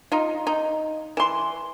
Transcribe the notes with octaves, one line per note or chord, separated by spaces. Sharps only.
D#4 F4
D#4
E3 C6